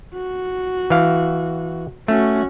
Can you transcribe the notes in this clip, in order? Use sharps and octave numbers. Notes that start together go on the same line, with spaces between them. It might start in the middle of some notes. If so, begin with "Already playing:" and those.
F#4
E3 F5
A3 C#4 F#4